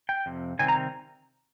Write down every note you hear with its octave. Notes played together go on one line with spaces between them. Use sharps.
G5
F2 C3
C3 D#3 G3 C4 G#5
A#5